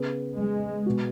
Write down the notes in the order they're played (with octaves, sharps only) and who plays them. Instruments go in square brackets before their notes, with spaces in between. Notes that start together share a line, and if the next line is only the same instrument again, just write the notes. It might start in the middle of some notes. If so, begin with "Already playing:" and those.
Already playing: [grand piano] C#3 B3 G#4
[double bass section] G#3
[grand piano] B2 B3 F#4